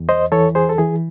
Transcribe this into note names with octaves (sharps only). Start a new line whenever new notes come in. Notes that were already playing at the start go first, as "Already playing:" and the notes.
Already playing: E2
C5 D#5
E3 A4 C#5
G#4 C5
A4
E3 G#4